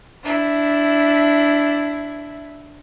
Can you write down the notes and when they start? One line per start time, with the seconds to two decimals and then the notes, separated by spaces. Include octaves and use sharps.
0.22 D4 E4